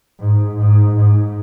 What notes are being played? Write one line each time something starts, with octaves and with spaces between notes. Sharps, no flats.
G#2
G#2
G#2